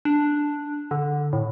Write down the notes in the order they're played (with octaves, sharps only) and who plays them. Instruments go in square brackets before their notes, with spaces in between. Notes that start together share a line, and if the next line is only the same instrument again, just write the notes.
[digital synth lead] D4
D3
A2